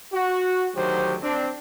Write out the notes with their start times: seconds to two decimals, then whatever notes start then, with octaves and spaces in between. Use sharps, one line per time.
0.13 F#4
0.75 D2 D#3 F#3 G4 C5
1.22 C4 D4